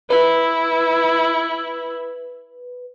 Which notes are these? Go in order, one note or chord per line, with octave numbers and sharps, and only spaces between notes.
E4 B4